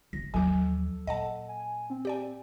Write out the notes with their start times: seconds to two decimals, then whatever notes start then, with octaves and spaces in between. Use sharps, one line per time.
0.13 F#1 A#6
0.34 D#2 F3 F#3 A4 G#5 D6
1.07 A#2 D#5 F#5 A5
1.48 G#5
1.90 C4
2.05 G4 D5 G#5